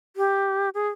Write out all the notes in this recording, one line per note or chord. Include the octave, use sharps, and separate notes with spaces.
G4
G#4